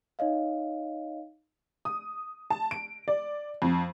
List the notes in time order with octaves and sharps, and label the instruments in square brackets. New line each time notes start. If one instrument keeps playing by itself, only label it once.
[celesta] D#4 C#5 D#5 F5
[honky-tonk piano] D#6
A5
D7
D5
F2